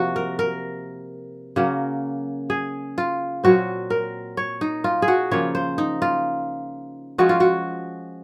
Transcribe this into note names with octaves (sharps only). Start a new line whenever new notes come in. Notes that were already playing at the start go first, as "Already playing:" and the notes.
Already playing: C3 F3 A#3 F#4
A#4
A#4
C#3 F#3 A#3
G#4
F4
A#2 F#3 C4 F#4
A#4
C#5
D#4
F4
G#4
F#4
C#3 F3 A#3 C#5
C5
D#4
F4
F3 G#3 C#4 F#4
F4
F#4